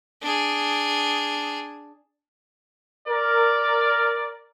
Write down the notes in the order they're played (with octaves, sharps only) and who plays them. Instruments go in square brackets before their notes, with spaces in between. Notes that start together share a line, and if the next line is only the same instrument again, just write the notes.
[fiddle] D4 G#4
[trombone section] A#4 [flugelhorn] D5